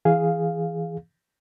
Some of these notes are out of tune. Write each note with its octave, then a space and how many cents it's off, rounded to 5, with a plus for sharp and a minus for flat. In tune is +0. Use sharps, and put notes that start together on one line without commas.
E3 +0 G#4 +0 F5 +0